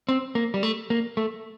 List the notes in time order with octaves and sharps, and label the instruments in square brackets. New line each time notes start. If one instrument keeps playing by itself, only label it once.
[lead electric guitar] C4
A#3
G3
A3
A#3
A3